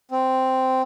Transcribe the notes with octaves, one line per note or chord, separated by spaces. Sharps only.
C4